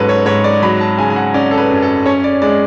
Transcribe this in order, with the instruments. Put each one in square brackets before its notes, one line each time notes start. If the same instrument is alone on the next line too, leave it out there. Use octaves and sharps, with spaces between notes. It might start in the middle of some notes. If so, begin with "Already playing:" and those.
Already playing: [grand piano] G#2 F#3 C#4 [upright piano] A4 B4
[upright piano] C#5
[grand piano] G#2 [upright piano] C#5
[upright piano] D5
[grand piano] F#3 [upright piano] B5
[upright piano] A5
[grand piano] C#3 [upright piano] G#5
[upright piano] G#5
F#5
[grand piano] C#4 [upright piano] D5
[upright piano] A4
B4
[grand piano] F#2
[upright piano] A4
[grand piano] C#4 [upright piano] C#5
[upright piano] D5
[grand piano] G#3 [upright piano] D5